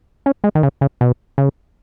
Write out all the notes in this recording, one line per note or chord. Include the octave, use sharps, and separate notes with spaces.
C#4
G#3
D#3
C#3
C#3
B2
C#3